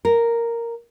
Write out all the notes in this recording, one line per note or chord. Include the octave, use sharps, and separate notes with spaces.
A#4